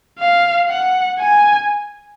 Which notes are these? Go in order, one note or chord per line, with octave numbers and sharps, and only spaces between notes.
F5
F#5
G#5